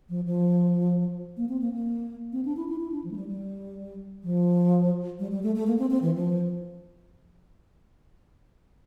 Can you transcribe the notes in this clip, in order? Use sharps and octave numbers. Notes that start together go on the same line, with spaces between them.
F3
F3
A#3
C4
A#3
A#3
C4
D4
E4
E4
E4
D4
F3
A3
G3
G3
F3
G3
G3
A3
A3
A#3
C4
C4
E3
F3